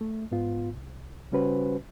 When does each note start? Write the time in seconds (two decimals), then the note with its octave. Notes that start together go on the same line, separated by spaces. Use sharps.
0.01 A3
0.31 G#2 B3 F4
0.74 C2
1.32 C#3 G3 C#4 F#4 B4 C5